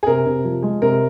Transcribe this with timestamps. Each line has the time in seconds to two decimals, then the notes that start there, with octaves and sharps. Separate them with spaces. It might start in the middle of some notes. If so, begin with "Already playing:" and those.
0.03 G#4
0.07 C3 A#4
0.26 C3
0.44 F3
0.62 G#3
0.82 C3 A#4